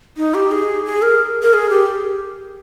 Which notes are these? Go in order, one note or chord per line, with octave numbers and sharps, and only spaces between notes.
D#4
G4
G#4
G#4
A#4
A#4
G#4
G4